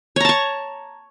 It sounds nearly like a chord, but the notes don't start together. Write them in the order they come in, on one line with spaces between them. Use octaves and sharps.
C#5 A#5 A5 C#6